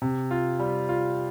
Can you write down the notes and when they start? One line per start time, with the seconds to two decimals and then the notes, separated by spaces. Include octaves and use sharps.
0.02 C3
0.31 F4
0.59 G3
0.89 F4